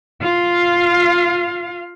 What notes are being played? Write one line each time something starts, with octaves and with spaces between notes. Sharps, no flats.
F4 F5